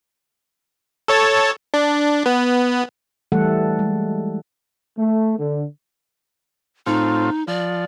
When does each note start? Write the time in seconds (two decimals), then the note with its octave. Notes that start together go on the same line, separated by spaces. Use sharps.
1.08 A4 C#5 A5
1.74 D4
2.26 B3
3.32 E3 G3 A3 A4 F#5
3.79 G#3
4.98 A3
5.39 D3
6.87 A2 C4 D#4 F4
7.47 F3 D5